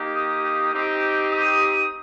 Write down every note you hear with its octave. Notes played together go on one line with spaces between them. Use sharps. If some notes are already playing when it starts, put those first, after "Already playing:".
Already playing: A#3 D#4 G4
D#6
C4 D#4 G4
D#6